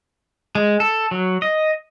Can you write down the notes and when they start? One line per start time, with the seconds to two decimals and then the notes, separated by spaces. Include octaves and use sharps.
0.55 G#3
0.80 A4
1.11 F#3
1.42 D#5